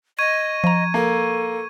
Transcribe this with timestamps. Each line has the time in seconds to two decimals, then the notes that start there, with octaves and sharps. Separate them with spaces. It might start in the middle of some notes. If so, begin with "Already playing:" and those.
0.19 D#5 C#6 G#6 D#7
0.64 F3 A#5
0.94 A#3 A4